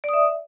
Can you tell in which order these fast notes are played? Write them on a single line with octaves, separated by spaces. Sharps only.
D5 D#6 E5